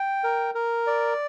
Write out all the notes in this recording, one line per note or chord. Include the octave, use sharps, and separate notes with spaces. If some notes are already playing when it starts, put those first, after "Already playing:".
Already playing: G5
A#4
A#4
D5